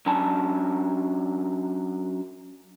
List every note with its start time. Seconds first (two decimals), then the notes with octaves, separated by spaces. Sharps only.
0.06 F#3 C#4 D4 G#5 A5